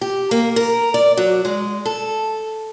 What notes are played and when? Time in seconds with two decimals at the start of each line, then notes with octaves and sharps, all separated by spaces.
0.01 G4
0.31 A#3
0.56 A#4
0.94 D5
1.17 F#3
1.45 G#3
1.86 A4